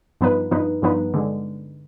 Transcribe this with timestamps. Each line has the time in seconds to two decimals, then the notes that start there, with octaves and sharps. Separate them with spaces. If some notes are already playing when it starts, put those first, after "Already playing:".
0.21 G2 F3 B3 D#4 B4
0.51 G2 F3 B3 D#4 B4
0.82 G2 F3 B3 D#4 B4
1.14 D3 G#3